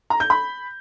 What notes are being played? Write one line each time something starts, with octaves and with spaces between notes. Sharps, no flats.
A#5
G6
B5